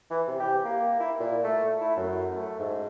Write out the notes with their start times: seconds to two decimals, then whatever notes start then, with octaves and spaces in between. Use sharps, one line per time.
0.11 E3
0.28 C3
0.40 G4
0.65 A#3
1.00 E4
1.20 A#2
1.44 A3
1.81 E4
1.97 F#2
2.36 A3
2.59 G#2